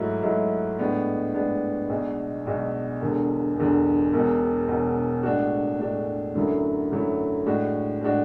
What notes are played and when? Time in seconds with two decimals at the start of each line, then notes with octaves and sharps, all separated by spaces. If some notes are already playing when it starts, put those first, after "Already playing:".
Already playing: G#2 F#3 A3 E4
0.23 G#2 F#3 A3 E4
0.79 A2 G#3 B3 D4
1.35 A2 G#3 B3 D4
1.89 B1 B2 G#3 D4
2.45 B1 B2 G#3 D4
3.01 E1 E2 D3
3.56 E1 E2 D3
4.13 E1 E2 B2
4.68 E1 E2 B2
5.23 A2 G#3 D4 F#4
5.79 A2 G#3 D4 F#4
6.35 F#2 D3 F#3 A3 E4
6.91 F#2 D3 F#3 A3 E4
7.46 A2 G#3 D4 F#4
8.01 A2 G#3 D4 F#4